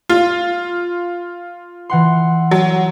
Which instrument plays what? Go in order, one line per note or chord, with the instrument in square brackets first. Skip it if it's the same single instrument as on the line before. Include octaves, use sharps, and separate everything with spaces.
[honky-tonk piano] F4
[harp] E3 F#5 C6
[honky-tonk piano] F#3